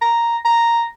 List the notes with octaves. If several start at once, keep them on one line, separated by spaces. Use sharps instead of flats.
A#5
A#5